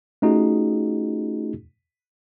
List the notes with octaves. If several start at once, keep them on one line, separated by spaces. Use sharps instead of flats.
A3 C#4 D#4 F4 F#4 G#4